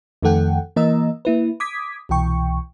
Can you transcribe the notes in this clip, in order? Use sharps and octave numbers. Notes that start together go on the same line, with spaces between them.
F2 D#3 A3 A4 F#5 G5
E3 A#3 D#5 A#5 E6
A#3 E4 B4
D6 D#6 G#6 B6
C2 B2 E3 G5 C#6